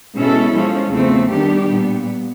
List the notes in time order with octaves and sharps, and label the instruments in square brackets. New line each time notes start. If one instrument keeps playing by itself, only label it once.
[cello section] B2 G#3 C#4 E4 A4
F3 G#3 C#4
E2 C#3 F3 A3 C4
D#3 G3 B3 D4 G4
A#2 G3 B3